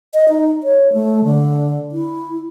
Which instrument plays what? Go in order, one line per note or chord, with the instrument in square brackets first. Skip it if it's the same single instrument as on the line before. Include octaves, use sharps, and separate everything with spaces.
[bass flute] D#5
D#4
C#5
A3
D3
E4